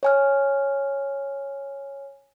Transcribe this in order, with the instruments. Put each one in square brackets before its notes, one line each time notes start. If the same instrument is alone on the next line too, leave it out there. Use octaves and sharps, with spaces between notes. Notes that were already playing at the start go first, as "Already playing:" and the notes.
[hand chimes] C#5 G#5 F6